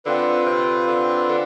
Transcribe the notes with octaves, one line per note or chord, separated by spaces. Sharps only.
D3 C4 F4 B4
C3
D3
D3